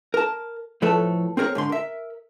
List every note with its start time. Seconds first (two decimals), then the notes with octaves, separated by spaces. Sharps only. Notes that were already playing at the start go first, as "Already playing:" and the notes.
0.14 A#4 A5
0.82 A2 F3 A3 A4 B4 C#5
1.37 C4 G#4 A#4 C#5
1.55 G#2 D3 C6
1.69 A#4 E5